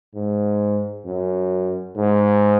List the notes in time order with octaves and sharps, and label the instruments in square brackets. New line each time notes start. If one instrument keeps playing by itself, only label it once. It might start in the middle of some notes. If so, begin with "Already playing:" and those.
[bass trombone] G#2
F#2
G#2